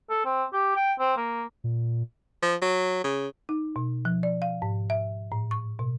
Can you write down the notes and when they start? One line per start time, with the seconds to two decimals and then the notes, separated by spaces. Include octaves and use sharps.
0.10 A4
0.26 C4
0.53 G4
0.76 G5
0.99 C4
1.17 A#3
1.64 A#2
2.42 F3
2.62 F#3
3.04 C#3
3.49 D#4
3.76 B2
4.05 F3
4.23 D5
4.42 F5
4.62 G#2
4.90 E5
5.32 A2
5.51 C#6
5.79 B2